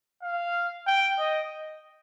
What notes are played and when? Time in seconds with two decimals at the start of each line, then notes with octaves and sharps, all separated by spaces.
0.23 F5
0.87 G5
1.19 D#5